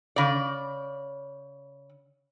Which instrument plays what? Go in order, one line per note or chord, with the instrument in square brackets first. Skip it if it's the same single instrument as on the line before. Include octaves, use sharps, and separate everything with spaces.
[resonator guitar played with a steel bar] C#3 D5